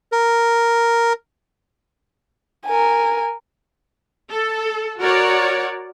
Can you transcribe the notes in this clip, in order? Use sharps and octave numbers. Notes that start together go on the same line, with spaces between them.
A#4
A#4 G#5
A4
F#4 A#4 C#5 D5